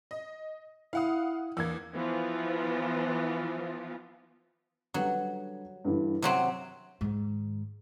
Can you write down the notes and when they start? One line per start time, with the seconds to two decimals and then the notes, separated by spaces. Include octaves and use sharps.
0.11 D#5
0.93 E4 F5 F#5 D#6
1.57 E2 A#3 E6 G#6
1.93 E3 F3 B3 F4
4.94 D3 F#3 G3 B4
5.85 G2 D3 E3
6.22 C3 F#3 C4 D#7
7.01 G#2 D#3